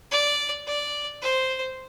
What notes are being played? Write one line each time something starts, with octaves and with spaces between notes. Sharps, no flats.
D5
D5
C5